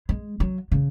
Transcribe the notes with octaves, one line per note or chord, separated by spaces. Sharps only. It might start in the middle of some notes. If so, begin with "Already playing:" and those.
G#3
F#3
C#3